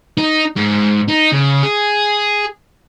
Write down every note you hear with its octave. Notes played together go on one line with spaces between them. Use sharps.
D#4
G#2
D#4
C#3
G#4